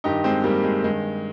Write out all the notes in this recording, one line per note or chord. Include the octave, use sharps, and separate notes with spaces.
G2 D#3 D#4 G4
G#3 C4
G3 A#3
G#3
G2 D#3 G#3